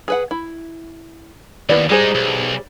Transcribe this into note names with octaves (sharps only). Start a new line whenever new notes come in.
G#4 B4 F#5
E4
D#2 B3 E4 D5
G3 G#3 D#4 G#4 C5
B1